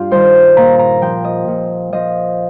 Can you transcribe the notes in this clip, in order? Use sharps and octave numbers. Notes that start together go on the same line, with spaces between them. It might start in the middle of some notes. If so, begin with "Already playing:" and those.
Already playing: G2 F4 G4
D#3 G3 C5
A#2 A#5
A#5
F3 G5
D#5
A#2
F3 D#5